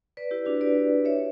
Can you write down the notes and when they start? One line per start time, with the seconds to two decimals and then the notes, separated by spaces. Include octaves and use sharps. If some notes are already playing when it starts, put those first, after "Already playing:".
0.17 B4 D5
0.31 E4 G4
0.46 D4 F#4
0.61 B4 D5
1.05 C#5 E5